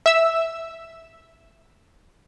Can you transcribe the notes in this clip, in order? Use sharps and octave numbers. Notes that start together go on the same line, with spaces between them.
E5 E6